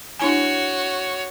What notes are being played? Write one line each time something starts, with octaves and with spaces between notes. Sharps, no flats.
D4 E4 F#4 C#5 G#5